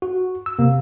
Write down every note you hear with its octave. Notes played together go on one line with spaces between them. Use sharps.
F#4
E6
C3 A#3